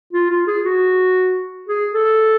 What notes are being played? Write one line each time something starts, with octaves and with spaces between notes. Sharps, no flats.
F4
F4
G#4
F#4
G#4
A4